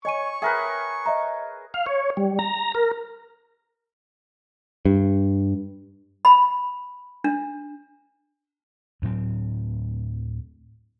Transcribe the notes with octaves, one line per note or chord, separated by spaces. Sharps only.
C#5 D#5 G#5 C#6 D#7
G#4 A#4 B4 E5 G5
D#5 E5 A#5
F5
C#5
G3
A#5
A#4
G2
B5
D4
D2 A2 F#3 C4